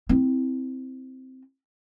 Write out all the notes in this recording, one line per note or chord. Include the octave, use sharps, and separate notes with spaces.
C4 E4